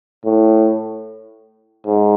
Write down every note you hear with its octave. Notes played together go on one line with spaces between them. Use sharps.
A2
G#2